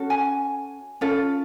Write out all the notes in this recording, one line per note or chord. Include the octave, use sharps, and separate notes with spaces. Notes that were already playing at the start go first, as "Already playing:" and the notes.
Already playing: C#4 F#4 A4
G#5
C#4 F4 A4